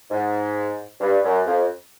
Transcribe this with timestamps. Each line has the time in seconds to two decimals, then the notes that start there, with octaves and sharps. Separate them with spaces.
0.11 G#2
1.00 G2
1.24 F#2
1.46 F2